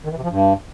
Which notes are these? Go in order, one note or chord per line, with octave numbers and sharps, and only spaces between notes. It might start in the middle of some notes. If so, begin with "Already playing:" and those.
D#3
E3
C3
F3
G2